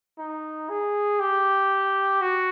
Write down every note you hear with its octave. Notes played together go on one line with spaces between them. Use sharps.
D#4
G#4
G4
F#4